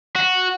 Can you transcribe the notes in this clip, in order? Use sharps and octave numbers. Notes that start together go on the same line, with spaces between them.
F#4